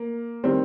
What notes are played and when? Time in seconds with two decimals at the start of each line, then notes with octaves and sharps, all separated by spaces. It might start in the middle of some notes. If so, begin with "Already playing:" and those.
Already playing: A#3
0.44 D#3 G3 C4